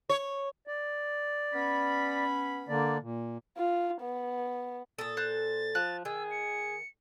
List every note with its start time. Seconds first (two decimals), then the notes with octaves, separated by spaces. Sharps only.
0.09 C#5
0.67 D5
1.53 B3 C#4 B5
2.69 D3 A#3 D5
3.02 A#2
3.57 F4
4.02 B3
4.98 A#2 A4 D#6 E6 A6
5.17 C5 F#6
5.75 F3 F#6
6.05 D#3 G#4 E6
6.31 C#7